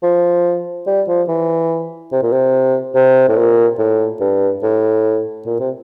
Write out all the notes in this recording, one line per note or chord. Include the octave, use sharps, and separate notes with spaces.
F3
G3
F3
E3
C3
A#2
C3
C3
A2
A#2
A2
G2
A2
A#2
C3